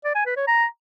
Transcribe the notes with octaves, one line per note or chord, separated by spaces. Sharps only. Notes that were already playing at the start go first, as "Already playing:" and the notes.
D5
G#5
B4
C#5
A#5